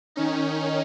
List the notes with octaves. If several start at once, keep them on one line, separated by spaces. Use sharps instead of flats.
D#3 C#4 D#4